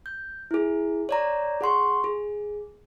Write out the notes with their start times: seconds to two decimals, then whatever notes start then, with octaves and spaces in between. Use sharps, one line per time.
0.06 G6
0.51 E4 G#4
1.09 C#5 D5 A#5
1.61 G#4 F#5 C6 C#6
2.04 G#4